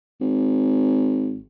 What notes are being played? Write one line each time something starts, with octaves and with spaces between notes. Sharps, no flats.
G#1